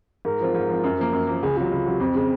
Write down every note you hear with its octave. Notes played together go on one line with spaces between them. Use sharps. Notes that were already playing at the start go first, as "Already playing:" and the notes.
G#2 A#4
F3 C4 F4
G#2
F3 C4 F4
F#2
F3 A#3
F#2
F3 A#3
C#2 G#4
C3 F#3 F4
C#2
C3 F#3
F2 C4
C#3 G#3